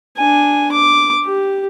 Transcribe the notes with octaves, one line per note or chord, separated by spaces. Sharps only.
D4 G#5
D6
G4